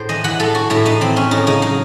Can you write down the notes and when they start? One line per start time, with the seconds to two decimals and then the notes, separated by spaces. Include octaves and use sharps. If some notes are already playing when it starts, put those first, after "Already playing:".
Already playing: A2 C5
0.09 E3 D#5
0.24 E3 F#5
0.40 A2 A4
0.55 E3 F#4
0.70 A2 E4
0.85 A2 D#4
1.01 E3 C4
1.16 E3 C#4
1.31 A2 D#4
1.47 C#3 D#4
1.62 F#3 D#4